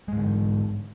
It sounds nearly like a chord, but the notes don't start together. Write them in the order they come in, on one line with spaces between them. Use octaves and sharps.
G#3 G#2 D3